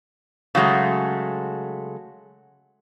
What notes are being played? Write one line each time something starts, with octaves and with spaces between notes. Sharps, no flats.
C#3 F#3 G#3 A3